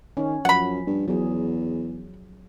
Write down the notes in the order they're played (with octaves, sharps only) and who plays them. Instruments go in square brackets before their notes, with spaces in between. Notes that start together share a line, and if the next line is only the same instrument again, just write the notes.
[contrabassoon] D#3 [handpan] C#4
[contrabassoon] F#2 [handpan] F3 [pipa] F#5 B5
[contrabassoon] G2
[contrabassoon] E2 [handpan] F#3 G#4